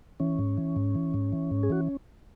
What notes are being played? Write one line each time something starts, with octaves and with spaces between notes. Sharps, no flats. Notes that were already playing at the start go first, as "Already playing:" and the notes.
E3 C#4
G#2
E3
G#2
E3
G#2
E3
G#2
G#4
E3 F#4